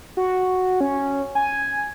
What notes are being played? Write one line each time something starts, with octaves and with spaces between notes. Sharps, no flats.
F#4
C#4
G#5